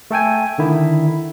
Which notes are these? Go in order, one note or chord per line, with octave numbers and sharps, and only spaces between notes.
A3 A4 G5 G#5
D3 D#3 E4